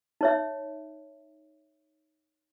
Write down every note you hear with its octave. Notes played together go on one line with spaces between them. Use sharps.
D#4 C#5 E5